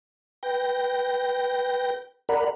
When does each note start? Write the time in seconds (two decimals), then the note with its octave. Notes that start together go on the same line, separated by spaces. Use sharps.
0.43 B4 G5 G6 A#6
2.29 A#4 D5 F#5 A#5 B5